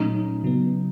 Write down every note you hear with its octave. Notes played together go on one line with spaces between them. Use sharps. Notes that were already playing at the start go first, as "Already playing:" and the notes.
Already playing: A#2 F#3 A3 C#4 D#4
C#3 F#3 B3